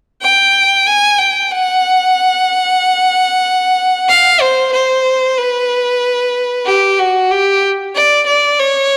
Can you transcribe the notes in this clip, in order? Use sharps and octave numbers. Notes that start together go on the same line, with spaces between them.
G5
G#5
G5
F#5
F5
C5
C5
B4
G4
F#4
G4
D5
D5
C#5